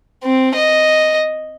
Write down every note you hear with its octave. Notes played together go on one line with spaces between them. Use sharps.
C4
D#5